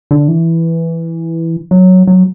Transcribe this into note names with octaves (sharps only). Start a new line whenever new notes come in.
D3
E3
F#3
F#3